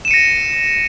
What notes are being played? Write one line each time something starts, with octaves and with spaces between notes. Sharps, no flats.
A#6 C#7 D#7 E7